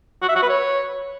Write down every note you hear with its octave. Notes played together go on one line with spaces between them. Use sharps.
F#4
E5
F#4
B4
C#5